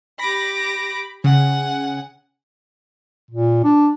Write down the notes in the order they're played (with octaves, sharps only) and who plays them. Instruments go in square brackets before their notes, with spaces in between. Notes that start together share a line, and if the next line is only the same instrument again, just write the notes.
[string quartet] G4 D6 A#6 [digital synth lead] B5
[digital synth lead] C#3 [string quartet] F#5 G#5
[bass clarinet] A#2
D4